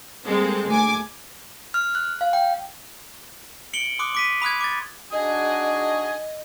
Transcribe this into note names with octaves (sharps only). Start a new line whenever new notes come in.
G3 G#3 A#3 C4 A4
D2 G#5 D6
F6
F#6
F5
G5
C#7 D7 F#7 G7
C6 D6 D#6 F#6
D6 B6 D#7
B5 D#6 F#6 G#6
D6 A6
D4 D#4 F#4 D#5 G#5 D#6